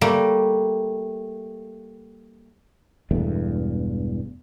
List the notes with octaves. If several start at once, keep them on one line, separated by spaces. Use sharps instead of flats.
G3 A3 A#3
E1 E2 G2 A3